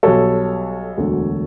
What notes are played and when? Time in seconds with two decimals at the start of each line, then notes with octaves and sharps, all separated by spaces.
0.03 B1 B2 G3 A4 C#5
0.97 E1 D2 D3 F#3